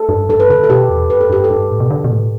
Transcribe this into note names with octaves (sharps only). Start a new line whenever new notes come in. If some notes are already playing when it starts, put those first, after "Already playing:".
Already playing: A4
G2
G2 A4
B4
D3 A4
A4
B2 G4
E2
G2 B4
A4
G2 G4
A4
G2
A2
B2
D3
B2
A2